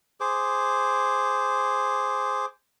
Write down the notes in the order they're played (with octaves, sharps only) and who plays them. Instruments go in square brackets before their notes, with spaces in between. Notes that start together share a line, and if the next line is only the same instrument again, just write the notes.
[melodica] G#4 C5 D6